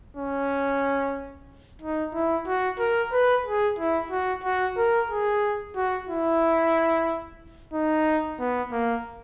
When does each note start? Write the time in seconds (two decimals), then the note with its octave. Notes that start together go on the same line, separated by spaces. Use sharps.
0.17 C#4
1.82 D#4
2.14 E4
2.47 F#4
2.79 A#4
3.13 B4
3.46 G#4
3.79 E4
4.11 F#4
4.44 F#4
4.78 A#4
5.10 G#4
5.76 F#4
6.09 E4
7.73 D#4
8.39 B3
8.72 A#3